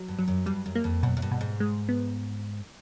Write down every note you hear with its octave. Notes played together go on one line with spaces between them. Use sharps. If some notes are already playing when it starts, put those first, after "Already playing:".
Already playing: F#3
G2
F#3
F#2
G2 G3
F#2
A#3
F2
F#2 B2
F#2
G2
B2
G#2
G#3
B3